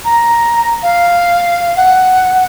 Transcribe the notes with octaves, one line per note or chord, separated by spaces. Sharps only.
A#5
F5
F#5